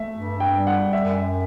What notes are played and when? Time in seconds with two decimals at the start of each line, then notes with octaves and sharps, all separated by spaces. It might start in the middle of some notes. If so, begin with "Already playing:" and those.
Already playing: A3 E5
0.14 G2
0.40 G5
0.53 G3
0.67 F#5
0.93 F#2 E5